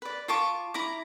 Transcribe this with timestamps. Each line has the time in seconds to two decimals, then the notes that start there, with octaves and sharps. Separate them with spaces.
0.02 B4 D5
0.28 F4 A5 C#6 D6
0.74 E4 A#5 D6